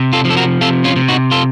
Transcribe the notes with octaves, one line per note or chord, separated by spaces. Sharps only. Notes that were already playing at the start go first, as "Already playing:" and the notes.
Already playing: C3
F4 A4
F3
A4
F#4 A#4
C3 F4 A4
C#4 F4
C3
D#4 F#4
F4 A4